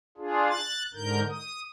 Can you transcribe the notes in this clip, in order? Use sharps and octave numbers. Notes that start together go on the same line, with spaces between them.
D4 F4 G#4
F#6 A6
G#2 D3 A#4 G6
D#6